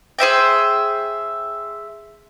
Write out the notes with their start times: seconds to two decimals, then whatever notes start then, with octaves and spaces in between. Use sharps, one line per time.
0.19 G#4 C5 E5 G5